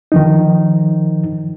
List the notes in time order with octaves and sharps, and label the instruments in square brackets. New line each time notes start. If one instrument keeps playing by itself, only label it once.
[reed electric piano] D#3 F3 D#4